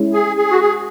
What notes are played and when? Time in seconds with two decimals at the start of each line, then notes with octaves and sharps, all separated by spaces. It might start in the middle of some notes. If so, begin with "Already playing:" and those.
Already playing: G#3 C#4 E4
0.13 G#4
0.37 G#4
0.51 F#4
0.60 G#4